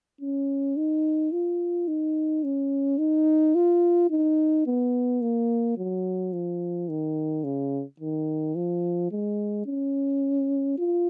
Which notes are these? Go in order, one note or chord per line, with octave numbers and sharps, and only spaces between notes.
C#4
D#4
F4
D#4
C#4
D#4
F4
D#4
B3
A#3
F#3
F3
D#3
C#3
D#3
F3
G#3
C#4
F4